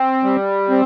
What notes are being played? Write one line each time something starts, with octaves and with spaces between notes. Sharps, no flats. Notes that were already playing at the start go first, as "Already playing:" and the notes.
Already playing: C4
G3
C4